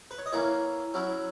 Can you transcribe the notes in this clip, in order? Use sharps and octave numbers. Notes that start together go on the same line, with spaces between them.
B4
C#5
D#5
E3 A#3 C#4 C#5 E5
F#3 C#4 E4